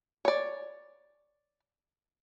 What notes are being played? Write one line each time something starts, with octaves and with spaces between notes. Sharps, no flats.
C#5 D5